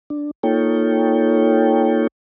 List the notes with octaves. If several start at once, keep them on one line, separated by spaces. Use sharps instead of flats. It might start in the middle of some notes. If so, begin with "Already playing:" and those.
D4
A#3 D#4 F4 A4 C#5 G5